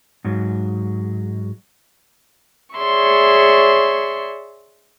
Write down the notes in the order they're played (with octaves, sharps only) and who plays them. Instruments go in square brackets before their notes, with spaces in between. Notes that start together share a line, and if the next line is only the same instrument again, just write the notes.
[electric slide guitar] G#2 F#3
[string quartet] G#4 C#5 D5 E5 C6 C#6